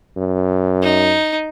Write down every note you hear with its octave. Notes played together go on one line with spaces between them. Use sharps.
F#2
D#4